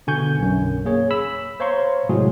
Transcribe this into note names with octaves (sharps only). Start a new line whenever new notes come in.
B2 D3 G#5 C#6 G6
B1 F#2
A#3 G#4 C#5
B5 E6
C5 C#5 F5 A#5 C6 C#6
A2 C3 F#3 G#3 F#4 G#4